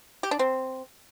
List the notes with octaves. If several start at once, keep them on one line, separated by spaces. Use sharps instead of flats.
G4
D4
C4